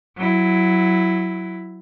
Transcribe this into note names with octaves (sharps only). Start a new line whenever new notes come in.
F#3 E4